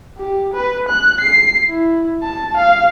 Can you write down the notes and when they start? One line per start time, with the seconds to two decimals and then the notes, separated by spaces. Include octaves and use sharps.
0.17 G4
0.54 B4
0.88 F#6
1.20 C7
1.68 E4
2.23 A5
2.56 F5